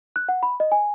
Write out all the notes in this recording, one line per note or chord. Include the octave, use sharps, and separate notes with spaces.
F#6
F#5
B5
D#5
G#5